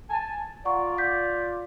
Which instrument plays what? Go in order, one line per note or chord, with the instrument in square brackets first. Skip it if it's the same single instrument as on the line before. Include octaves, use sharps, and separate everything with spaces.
[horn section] G#5 A5
[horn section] F4 D5 [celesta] F#5 A#5 C#6
[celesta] G6 B6